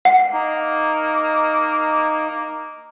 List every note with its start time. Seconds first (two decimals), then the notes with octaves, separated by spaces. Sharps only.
0.05 F#5
0.33 A#3 D#4